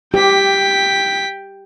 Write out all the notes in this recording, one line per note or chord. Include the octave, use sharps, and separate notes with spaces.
G4 G5 B6